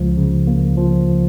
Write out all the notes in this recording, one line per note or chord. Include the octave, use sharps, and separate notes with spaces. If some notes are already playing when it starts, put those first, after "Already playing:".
Already playing: C#2 F3
C#3
A#3
F3